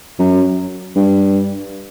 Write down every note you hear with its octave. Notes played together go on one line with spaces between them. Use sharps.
F#2
G2